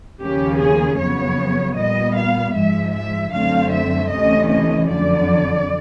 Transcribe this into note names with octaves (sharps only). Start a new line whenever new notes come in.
D#2 C#3 F3 A#3 C#4 G4
G#4
F2 C#3 F#3 B3 C#5
A#2 G3 B3 D#5
F5
G#2 F3 G#3 E5
E5
F#2 D3 F#3 A3 C4 F5
E5
D2 C3 E3 A3 C#4 D#5
D#5
F2 D3 F#3 D5